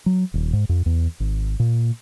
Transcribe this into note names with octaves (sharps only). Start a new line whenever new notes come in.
F#3
D#1
G#2
F2
E2
G#1
A#2